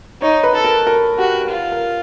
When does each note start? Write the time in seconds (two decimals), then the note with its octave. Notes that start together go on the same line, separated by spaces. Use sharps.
0.21 D#4 C#5
0.43 B4
0.54 A4
0.65 A#4
0.87 A#4
1.19 F#4 G4
1.51 F4
1.72 A#4